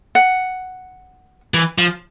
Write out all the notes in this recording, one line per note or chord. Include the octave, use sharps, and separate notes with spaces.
F#5
E3
F3